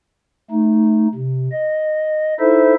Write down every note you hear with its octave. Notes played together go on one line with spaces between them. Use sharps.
A3 D#4
C3
D#5
D#4 E4 A4 C5 E5